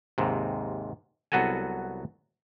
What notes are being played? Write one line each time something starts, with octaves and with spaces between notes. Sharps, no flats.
D#2 G#2 C3
C2 F#3 B3 F#4 A4 G#5